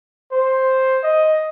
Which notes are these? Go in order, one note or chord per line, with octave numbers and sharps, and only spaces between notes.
C5
D#5